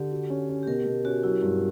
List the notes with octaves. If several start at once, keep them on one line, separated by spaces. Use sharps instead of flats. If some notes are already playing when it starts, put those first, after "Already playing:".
Already playing: D3 G4
F#4
C#4
C#4
G4
B2 A#4
B2 A#4
C#4 F#4
F#3 E4
G2